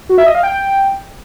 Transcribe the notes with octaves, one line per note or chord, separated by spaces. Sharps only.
F#4
E5
D#5
F5
G5